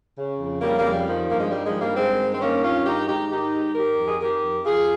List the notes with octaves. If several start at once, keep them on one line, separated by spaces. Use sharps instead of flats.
C#3
F2
C#3 G3 A#3
G3 A#3
F2
G3
D#3 F3
G2 A#3
G#3
D#3 G3
F3 G#3
G2
G3 A#3
D#3 G#3 C4
G2
C4
D#3 A#3 C#4
G2 C#4 F4
D#3 D#4 G4
G#2 D#4 G4
D#3 D#4 G4
G#2
D#3 G4 A#4
F2
G#4
D#3 G4 A#4
F2
F2 F4 G#4